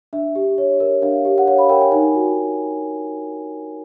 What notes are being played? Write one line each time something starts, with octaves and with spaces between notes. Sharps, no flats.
D4 E5
G4
C#5
A#4
D4 F5
G4
F#5
C#5 F5
B5
A#4 G5
G#5
D#4 G#5
F#4